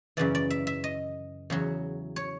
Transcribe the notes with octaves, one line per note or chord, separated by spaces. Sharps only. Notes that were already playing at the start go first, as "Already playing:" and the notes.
F#2 C#3 E3 D5
D5
E5
E5
D#5
E2 C#3 F#3
C#5